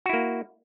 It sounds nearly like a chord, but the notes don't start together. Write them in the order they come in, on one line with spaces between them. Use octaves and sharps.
F#4 E4 A#3